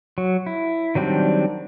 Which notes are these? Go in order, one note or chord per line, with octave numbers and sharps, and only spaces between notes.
F#3
E4
D#3 F#3 G3 C4 D4